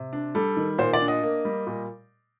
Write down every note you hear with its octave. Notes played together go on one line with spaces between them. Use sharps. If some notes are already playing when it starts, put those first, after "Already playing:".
Already playing: C3
D4
G3 A4
D#3
A#2 C5
D5
D4
D#5
A#3
G3
A#2